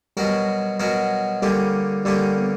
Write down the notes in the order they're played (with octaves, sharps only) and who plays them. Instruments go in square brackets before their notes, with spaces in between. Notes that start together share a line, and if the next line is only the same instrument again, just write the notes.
[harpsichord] B2 F#3 C#4 F#4 A#4 [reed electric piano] G3
[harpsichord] B2 F#3 C#4 F#4 A#4
[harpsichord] D3 A#3 C#4 G4 [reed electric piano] G3
[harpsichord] D3 A#3 C#4 G4 [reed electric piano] G3
[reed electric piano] B3